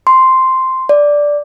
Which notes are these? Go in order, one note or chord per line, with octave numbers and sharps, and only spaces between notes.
C6
D5